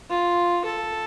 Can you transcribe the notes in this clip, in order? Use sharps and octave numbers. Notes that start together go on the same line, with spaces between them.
F4
A4